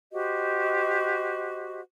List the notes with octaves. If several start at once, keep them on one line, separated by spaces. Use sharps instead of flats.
F#4 G4 C5 D#5